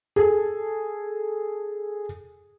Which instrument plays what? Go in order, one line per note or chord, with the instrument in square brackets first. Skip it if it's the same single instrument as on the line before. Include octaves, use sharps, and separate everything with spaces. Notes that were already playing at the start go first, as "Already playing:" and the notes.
[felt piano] G#4 A4